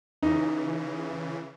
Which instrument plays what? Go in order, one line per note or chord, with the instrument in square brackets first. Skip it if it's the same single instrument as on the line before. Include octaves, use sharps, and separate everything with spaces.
[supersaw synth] C#3 E3 [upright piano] D#4